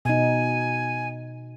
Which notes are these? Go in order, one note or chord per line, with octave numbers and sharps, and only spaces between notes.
B2 D#4 G#5